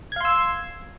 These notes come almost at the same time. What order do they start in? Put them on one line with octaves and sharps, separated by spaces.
G#6 F5 C6 E6